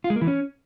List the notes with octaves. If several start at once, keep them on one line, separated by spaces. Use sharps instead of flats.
F4
G#3
A#3
E3
C#4